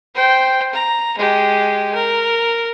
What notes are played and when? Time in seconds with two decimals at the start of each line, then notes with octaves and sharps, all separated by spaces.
0.15 C5 G5
0.73 A#5
1.18 G#3 G4
1.94 A#4